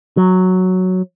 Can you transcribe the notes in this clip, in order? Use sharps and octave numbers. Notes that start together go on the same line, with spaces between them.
F#3